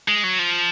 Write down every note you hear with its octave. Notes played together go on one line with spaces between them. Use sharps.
G#3
F#3
F3